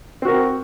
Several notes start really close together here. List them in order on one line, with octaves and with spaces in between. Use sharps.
C4 F#4 A#4